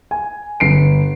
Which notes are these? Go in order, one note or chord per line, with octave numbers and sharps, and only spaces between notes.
G#5
G1 C7 D7